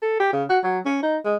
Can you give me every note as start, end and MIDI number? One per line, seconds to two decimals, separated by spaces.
0.02 0.19 69
0.20 0.29 67
0.33 0.43 49
0.50 0.59 66
0.64 0.79 54
0.86 1.00 61
1.03 1.17 63
1.25 1.35 56